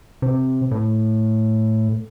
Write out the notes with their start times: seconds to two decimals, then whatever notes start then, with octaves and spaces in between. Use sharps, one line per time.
0.22 C3
0.71 A2